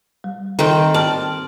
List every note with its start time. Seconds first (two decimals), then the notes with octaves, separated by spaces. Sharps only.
0.24 G3
0.59 D#3 C4 A4 G5
0.94 G#2 D5 A5 F6